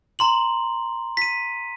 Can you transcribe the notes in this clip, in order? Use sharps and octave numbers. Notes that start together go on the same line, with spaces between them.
A#5 C6 F#7
B6 D#7